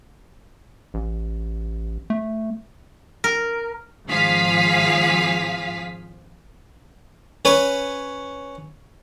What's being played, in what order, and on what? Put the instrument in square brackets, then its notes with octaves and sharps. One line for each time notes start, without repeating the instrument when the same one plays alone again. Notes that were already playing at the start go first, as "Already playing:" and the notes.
[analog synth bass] A1
A3
[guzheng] A#4
[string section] G#1 F3 G#4 F5 B6
[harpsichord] C#4 B4 C#5